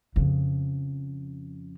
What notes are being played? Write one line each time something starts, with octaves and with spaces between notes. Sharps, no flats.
F2 C#3